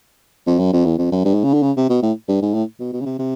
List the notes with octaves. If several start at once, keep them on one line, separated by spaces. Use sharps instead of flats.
F2
F#2
F2
E2
F2
F#2
G2
G#2
C#3
D3
C#3
C3
B2
A2
G2
G#2
A2
B2
B2
C#3
C3
C3